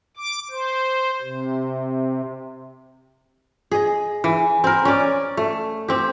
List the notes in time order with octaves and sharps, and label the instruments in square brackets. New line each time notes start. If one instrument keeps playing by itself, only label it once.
[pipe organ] D6
C5
C3
[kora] G#4 D#5
E3
C4 A#4
C#4 D5
A3
C4 G4